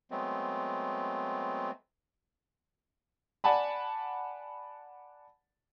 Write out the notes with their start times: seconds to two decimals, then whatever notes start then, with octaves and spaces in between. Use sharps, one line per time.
0.11 F#3 G#3 A3 B3 C4
3.44 D5 F#5 G#5 A5 B5